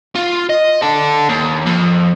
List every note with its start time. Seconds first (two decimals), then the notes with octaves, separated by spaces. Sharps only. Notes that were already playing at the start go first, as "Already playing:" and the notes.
0.15 F4
0.50 D#5
0.82 D4 A4
1.29 D#2
1.66 F2